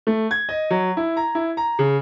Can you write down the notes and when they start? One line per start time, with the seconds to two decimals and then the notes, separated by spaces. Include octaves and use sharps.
0.07 A3
0.31 G#6
0.49 D#5
0.70 F#3
0.97 E4
1.17 A#5
1.35 E4
1.57 A#5
1.79 C#3